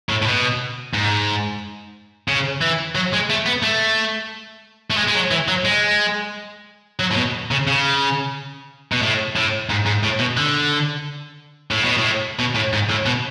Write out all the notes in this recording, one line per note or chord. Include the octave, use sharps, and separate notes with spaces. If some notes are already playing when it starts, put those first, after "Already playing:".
A2
A2
B2
G#2
C#3
E3
F#3
G#3
A3
B3
A3
A3
G#3
G#3
F#3
E3
F#3
G#3
F#3
A2
B2
C#3
C#3
B2
A2
A2
G#2
G#2
A2
B2
D3
A2
B2
A2
B2
A2
G#2
A2
B2